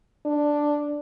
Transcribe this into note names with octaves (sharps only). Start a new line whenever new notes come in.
D4